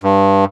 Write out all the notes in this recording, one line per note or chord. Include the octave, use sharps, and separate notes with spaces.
G2